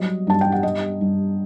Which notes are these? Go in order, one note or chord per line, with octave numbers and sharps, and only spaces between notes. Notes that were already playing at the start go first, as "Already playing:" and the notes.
Already playing: F#3 G3 D#5
G2 A5
G5
F#5
G3 D#5
G2